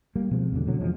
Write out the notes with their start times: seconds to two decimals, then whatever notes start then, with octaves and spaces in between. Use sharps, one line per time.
0.16 G3 A#3
0.31 B2 F3 G#3 C4
0.52 E2 B2 D3
0.67 B2 D3 F#3
0.81 E2 F3 F#3 G#3